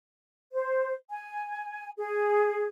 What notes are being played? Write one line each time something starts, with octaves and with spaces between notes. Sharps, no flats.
C5
G#5
G#4